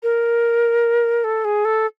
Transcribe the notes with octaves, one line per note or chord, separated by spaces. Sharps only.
A#4
A4
G#4
A4